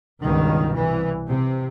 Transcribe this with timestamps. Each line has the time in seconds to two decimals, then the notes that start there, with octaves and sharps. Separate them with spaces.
0.20 C#2 G2 B2 D#3
0.75 C2 E3
1.28 C3